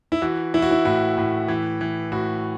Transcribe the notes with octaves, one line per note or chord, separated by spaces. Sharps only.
E4
E3 F#4
E3 E4
F#4
E4
A2 F#4
A2
E3
E3
A2 F#4